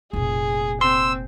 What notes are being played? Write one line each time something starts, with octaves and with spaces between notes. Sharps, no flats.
F1 A#2 G#4
C4 C6 E6